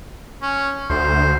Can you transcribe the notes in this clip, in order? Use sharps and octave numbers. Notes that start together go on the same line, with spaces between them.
C#4
D2 C5